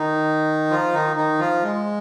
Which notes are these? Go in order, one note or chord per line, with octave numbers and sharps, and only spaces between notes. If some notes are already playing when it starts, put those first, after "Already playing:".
Already playing: D#3 D#4
F3 F4
D#3 D#4
D#3 D#4
F3 F4
G#3